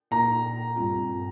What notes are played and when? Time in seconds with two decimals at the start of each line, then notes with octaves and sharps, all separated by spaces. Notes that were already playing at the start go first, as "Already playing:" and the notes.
0.11 A#2 A#3 D#4 A#4 A#5
0.76 G2 G3 C4 F4